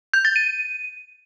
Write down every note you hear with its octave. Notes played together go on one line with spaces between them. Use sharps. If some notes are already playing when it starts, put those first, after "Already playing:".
G6
A6
D#7